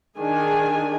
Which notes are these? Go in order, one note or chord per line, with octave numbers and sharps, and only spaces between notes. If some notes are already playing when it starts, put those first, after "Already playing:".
D#3 D4 G#4 G#5